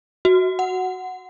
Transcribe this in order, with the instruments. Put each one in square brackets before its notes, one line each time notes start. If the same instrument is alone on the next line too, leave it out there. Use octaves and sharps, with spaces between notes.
[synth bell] F#4
F#5